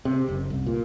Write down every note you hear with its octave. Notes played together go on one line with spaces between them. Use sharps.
C3
F#1
C2
A#2